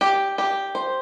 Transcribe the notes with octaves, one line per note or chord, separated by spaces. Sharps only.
G4
G4
C5